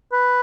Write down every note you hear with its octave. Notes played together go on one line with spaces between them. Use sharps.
B4